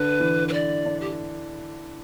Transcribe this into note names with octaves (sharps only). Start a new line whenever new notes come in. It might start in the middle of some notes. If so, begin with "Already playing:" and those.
Already playing: D3 B4
E3
B4
D5
D4
G4